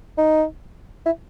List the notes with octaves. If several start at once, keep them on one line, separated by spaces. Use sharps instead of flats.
D#4
E4